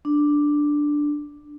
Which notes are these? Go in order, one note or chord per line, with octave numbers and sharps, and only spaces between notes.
D4